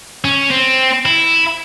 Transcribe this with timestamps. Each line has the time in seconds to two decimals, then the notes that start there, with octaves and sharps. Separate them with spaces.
0.25 C#4
0.51 C4
1.05 E4